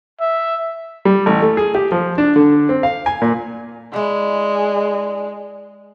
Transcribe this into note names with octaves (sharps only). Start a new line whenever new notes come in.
E5
G3
A1
A3
G#4
G4
F3
D4
D3
C4
F5
G#5
A#2
G#3 D4 E4